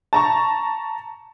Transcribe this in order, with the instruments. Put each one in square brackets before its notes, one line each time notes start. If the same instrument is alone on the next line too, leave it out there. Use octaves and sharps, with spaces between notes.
[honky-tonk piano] A5 A#5 C#6